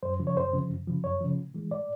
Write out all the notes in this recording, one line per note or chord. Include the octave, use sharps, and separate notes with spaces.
F#2 C5
C#3 F3
C#5
F#2 C5
C#3 F3
F#2
C#3 F3
F#2 C#5
C#3 F3
A2
E3 G#3
A2 D5